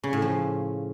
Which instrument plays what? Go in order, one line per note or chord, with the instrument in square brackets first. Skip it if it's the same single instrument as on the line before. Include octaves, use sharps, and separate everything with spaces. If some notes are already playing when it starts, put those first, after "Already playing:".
[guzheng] C#3
A2
F3